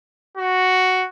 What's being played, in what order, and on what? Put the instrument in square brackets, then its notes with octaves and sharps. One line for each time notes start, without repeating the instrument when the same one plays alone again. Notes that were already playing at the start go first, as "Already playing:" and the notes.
[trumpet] F#4